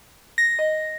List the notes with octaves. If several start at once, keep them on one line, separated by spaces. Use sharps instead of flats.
A#6
D#5